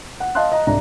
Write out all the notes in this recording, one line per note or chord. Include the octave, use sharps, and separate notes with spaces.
F#5
D#5 F5 A5 C6 F#6
D#5 A#5
C2 G#2 D4 A#5